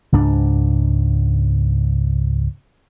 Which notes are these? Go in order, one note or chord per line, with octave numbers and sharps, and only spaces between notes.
C#2 G#2 D4